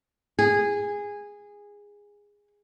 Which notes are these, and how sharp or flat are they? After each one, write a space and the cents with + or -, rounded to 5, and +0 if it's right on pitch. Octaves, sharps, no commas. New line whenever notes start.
G#4 -15